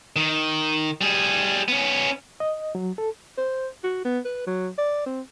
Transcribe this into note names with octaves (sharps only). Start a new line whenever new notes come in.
D#3
G3 G#4
B3 C#4
D#5
F#3
A4
C5
F#4
B3
B4
F#3
D5
C4